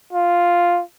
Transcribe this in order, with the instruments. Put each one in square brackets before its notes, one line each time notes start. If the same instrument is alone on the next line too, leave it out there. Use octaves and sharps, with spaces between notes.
[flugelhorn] F4